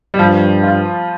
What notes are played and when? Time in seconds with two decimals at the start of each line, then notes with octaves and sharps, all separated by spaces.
0.14 G3
0.18 G2 F3
0.63 F4